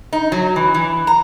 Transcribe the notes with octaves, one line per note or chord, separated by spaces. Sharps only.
D#4
F#3
E3
E3
A#5